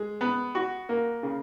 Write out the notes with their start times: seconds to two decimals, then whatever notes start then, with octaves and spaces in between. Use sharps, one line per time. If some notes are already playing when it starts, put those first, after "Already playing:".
Already playing: G#3
0.21 B3
0.55 F#4
0.89 A#3
1.23 C#3